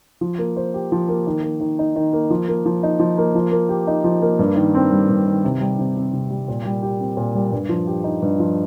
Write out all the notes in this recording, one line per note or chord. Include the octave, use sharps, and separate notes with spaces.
F3
A#3
C5
G4
F3
A#3
D#3
A#3
D#3
D#4
D#3
A#3
F3
A#3
F3
D#4
F3
A#3
F3
A#3
G4
D#4
F3
A#3
G2
D#3
C4
G3
G2
D#3
C3
G3
C3
C4
C3
G3
A#2
G3
G4
C4
A#2
G3
G2
F3
G4
D#4
G2
F3